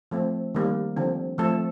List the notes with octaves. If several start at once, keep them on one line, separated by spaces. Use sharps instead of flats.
F3 A3 C4
D#3 G3 A#3
D3 F3 C4
F3 A3 C4 A4